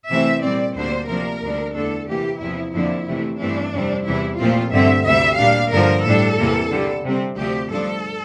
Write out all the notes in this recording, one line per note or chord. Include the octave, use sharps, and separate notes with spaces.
C3 E3 A3 C4 E5
A#2 G3 C4 D5
D2 D3 G3 A#3 D4 C5
C3 F3 A#3 D4 A#4
D2 D3 G3 D4
E2 D3 A3 D4 A4
C3 E3 A#3 G4
E2 C3 F3 E4
F2 D3 F3 A#3 D4 E4
C3 E3 A3
G2 E3 A3 C4 D4
F2 C3 G3 C4
E2 C3 E3 G3 E4
A#2 F3 A3 C4 F4
G2 D3 A3 C4 E5
D2 C3 G3 E5
A#2 G3 D4 F5
G2 D3 F3 A#4
A2 G3 D4 A4
E2 C3 E3 A#3
G2 D3 G3
C3 G3 C4
D2 C3 F3 C4 G4
G2 F3 A3 D4 A4